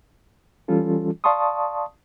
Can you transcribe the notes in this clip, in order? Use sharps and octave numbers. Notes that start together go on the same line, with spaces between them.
E3 G3 C#4 F4 A4
D5 F5 A5 C6 C#6 D#6